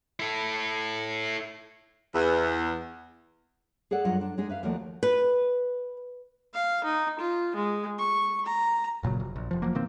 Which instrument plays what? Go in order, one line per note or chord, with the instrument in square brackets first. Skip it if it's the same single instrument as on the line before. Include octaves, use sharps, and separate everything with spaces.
[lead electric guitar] E4 A4
[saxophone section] E2
[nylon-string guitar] G#4 A4 D5 F#5
G2 F#3 F4 D5 D#5 F#5
D4
G#3 D4 D#4 G#4
B4 E5 F5
D#2 F3 A3 F#4 D5
B4
[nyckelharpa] F5
D#4
F4
G#3
C#6
A#5
[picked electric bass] F1 A#2 C#3 F#3
F1
A#1
F1 F3
F1 F3 F#3 A#3
B2 D#3 A#3 C4